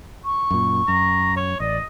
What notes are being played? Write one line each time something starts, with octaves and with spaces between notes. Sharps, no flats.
C#6
F#2 A#2
F#2 A#5
C#5
A1 D5 D#5